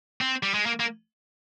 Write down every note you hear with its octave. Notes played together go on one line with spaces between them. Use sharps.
C4
G3
G#3
A#3
A#3